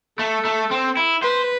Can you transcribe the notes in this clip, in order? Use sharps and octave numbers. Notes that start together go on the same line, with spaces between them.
A3 A4
A3
C4
E4
B4 C5